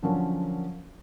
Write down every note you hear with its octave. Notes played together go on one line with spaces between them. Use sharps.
D3 F3 F#3 C#4 D4 A#4